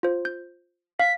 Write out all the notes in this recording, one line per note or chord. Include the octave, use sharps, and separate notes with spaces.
F4 C5
G6
F5 B6